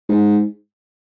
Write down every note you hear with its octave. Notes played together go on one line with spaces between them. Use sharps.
G#2